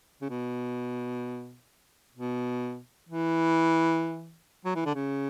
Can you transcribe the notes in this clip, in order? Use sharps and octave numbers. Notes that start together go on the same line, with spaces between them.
C#3
B2
B2
E3
F#3
E3
D3
C#3